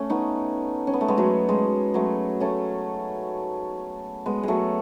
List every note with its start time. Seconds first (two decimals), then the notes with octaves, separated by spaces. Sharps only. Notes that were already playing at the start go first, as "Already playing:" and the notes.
Already playing: A3 C#4
0.10 B3 D#4
0.87 C#4
0.93 B3
1.01 A3
1.08 G#3 B3
1.17 F#3 A3
1.49 G#3
1.94 F#3 A3
2.40 A3 C#4
4.26 G#3 B3
4.43 F#3 G#3 A3